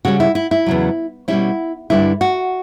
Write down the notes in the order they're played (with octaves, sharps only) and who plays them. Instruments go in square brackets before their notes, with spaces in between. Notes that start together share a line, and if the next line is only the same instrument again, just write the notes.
[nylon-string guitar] C#3 G3 C#4 F#4
E4
E4
E4
E2 C#3 F#3
B2 G3 C#4 E4
G2 D3 G3 B3 D4 E4
F#4